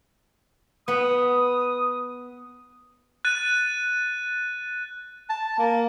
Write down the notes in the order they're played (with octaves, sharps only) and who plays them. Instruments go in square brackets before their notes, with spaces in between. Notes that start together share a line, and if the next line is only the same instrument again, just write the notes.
[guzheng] B3 [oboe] D#6
[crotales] F#6 A6 D#7
[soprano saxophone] A5
A#3